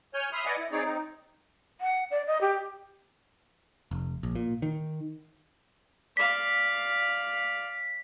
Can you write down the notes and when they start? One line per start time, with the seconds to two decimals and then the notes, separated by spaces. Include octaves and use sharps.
0.14 C#5 G#5 F6 G6
0.33 E5 B5 C6 D#6 F6
0.46 B4 D5 D#5 F#5 G#5
0.58 E4
0.72 C4 D#4 G#4 C#5 D5
0.85 C4 D#4
1.80 F#5
2.11 D5
2.27 D#5
2.41 G4
3.91 F1
4.23 A#1
4.35 A#2
4.62 D#3
6.17 D5 F5 B6